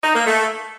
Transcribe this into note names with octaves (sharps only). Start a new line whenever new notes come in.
D#4
A#3
A3